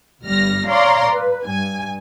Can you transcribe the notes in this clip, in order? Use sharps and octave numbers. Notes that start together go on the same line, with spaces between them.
G1 G2 G3 F6 A#6
C#5 D5 F5 A#5 C6
B4
G2 G#5